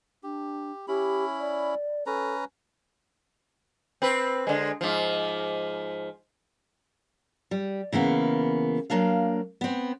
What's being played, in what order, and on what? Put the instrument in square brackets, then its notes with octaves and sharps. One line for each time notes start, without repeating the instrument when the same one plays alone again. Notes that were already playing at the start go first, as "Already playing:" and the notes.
[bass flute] D4 [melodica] G4
[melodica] C#4 E4 B5 [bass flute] G4
[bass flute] D5
[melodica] C#4 B4 A#5 [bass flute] A4
[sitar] C4 B4
D3 G#3
G#2 F3
[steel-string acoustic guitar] G3
C#3 E3 A#3 B3
F#3 A#3 D4 F5
B3 C4